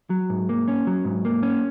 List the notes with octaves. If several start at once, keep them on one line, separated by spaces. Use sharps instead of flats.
F#3
G#2
A#3
C#4
F#3
G#2
A#3
C#4